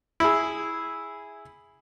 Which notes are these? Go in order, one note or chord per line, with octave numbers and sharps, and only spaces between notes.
E4 G#4